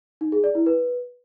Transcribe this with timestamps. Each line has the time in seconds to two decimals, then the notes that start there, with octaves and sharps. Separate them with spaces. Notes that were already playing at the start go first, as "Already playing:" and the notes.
0.21 D#4
0.32 G#4
0.44 D5
0.55 E4
0.66 B4